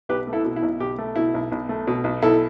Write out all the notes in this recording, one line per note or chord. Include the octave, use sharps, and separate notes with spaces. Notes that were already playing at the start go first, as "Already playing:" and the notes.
B1 G4 B4
A3
E4 A4
B2
E4
B1
B1 G4
A3
B2 E4
B1
B1
A3
B2
B1
B1 E4 A4